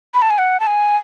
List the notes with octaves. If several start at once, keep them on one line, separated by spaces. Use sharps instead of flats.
B5
A5
G#5
F#5
A5
G#5